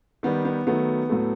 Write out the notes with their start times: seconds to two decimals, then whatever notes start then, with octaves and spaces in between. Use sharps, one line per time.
0.23 D#3 G3 B3
0.45 B3
0.67 D#3 F#3 A3 B3
1.09 A2 F#3 A3